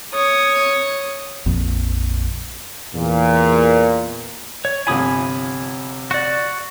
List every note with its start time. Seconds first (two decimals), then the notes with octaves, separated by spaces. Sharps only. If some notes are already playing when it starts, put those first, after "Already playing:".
0.14 C#5 D#6
1.46 A#1 F2
2.94 E2 A#2
4.65 C#5
4.87 G1 C3 F3 G#5 B5 D#6
6.11 F#4 D5